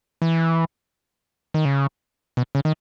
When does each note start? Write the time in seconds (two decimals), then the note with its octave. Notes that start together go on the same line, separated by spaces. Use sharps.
0.22 E3
1.54 D#3
1.65 C#3
2.37 B2
2.55 C#3
2.65 D#3